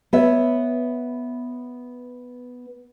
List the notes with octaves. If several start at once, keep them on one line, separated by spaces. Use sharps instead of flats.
B3 C#5 E5